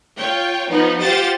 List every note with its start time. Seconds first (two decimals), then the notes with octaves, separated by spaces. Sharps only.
0.16 F4 C#5 G5
0.69 F3 B3 D#4
0.99 F4 G4 C5 F#5 A6